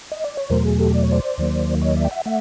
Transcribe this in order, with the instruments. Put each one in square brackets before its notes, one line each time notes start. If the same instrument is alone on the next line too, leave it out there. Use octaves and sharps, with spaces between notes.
[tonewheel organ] D#5
D5
C#5
E2 B2 F#3 A3 A#4 C5
G#4
G4 A4
D5
C#5
C5 D5
D#2 D#3 F#3 A#3
C#5 D#5
D5 E5
G5
E5 F#5
A3 E5 F#5